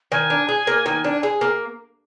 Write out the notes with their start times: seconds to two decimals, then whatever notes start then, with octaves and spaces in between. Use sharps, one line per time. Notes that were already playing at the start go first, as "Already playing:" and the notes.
0.12 D#3 G#5
0.30 D4
0.49 G#4
0.67 A#3
0.86 D#3
1.04 D4
1.23 G#4
1.41 A#3